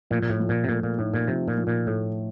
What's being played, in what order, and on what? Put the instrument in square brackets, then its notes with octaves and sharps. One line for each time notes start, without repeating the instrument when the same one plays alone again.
[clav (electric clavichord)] A#2 [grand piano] F3
[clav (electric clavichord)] A#2
A2
[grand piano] F3
[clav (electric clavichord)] A#2
C3
[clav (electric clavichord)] A#2 [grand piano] A3
[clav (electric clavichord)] A#2
[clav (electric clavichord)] A2 [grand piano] D#4
[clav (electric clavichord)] A#2
[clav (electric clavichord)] C3 [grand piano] F3
[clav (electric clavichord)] A#2
[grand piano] F3
[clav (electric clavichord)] A#2
[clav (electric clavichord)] A2 [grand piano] A3